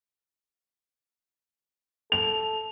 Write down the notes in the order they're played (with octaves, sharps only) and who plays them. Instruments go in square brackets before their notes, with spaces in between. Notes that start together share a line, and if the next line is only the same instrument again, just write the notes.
[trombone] A4 [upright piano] F7